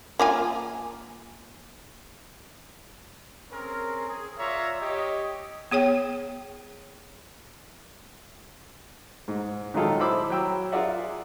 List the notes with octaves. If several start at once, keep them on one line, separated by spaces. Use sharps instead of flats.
A#3 F4 G#5
C4 C#4 G#4 A#4
G#4
F4 C#5 D5 E5 A#5
G4 C#5 D#5
B3 G#4 C#5 G5
G#2
A#2 D#3 F#3 G#3 F4 A4
E4 C5 B5 D6 E6
F#3 G5 E6
F4 G#4 A#4 D5 E5 F#5